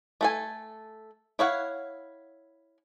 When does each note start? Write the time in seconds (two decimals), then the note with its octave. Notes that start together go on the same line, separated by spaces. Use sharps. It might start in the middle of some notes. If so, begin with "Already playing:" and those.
0.21 A3 A4 G#5
1.39 E4 C#5 F5 F#5